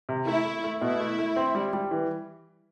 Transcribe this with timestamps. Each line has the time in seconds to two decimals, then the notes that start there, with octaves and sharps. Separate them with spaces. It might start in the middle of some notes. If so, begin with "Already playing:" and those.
0.09 C3
0.27 A3 E4
0.45 A3
0.64 A3
0.81 B2 E4
1.00 A3
1.18 A3
1.36 C4
1.55 G3
1.73 G3
1.91 E3